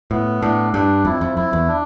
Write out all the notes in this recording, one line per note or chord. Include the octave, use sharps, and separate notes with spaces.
A2 B3
A2 D4
G2 D4
F2 E4
F2
F2 E4
E2
D4